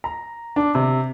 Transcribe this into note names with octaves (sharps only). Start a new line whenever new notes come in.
A#5
D4
C3